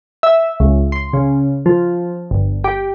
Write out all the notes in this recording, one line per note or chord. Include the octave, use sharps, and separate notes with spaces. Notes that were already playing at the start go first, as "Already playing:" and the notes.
E5
C#2
C6
C#3
F3
G1
G4